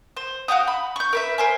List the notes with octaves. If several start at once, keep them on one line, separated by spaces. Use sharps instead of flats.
C5
F#4 F5 G5 D#6
B5
C#6 G6
A#4 B4 E5
A#4 C5 G#5